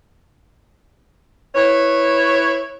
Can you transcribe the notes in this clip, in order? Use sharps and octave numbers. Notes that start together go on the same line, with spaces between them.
E4 B4 C#5